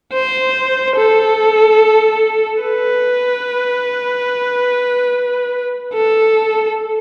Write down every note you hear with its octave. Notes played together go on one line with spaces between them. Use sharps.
C5
A4
B4
A4